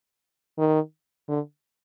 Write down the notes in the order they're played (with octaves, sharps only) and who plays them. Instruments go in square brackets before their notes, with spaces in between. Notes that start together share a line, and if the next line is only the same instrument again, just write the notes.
[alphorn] D#3
D3